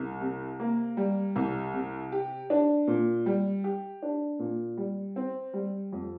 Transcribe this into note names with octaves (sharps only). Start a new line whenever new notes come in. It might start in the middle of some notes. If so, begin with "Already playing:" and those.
Already playing: C2
C3
A#3
G3
C2
C3
G4
D4
A#2
G3
G4
D4
A#2
G3
C4
G3
F2